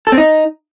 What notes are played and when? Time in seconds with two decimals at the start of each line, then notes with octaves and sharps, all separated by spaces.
0.07 A4
0.12 C4
0.18 D#4